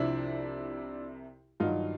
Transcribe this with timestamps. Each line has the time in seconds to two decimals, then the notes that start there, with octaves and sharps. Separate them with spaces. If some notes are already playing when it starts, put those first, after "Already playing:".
Already playing: C2 C3 F3 D4 E4
1.60 G2 D#3 F#3 D#4 F4